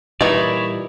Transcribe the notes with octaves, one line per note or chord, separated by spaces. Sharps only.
A#2 E3 G3 D#4 E4 C#5 D5